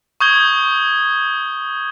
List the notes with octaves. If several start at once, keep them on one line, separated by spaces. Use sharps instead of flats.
C#6 D#6 G6 G#6 G7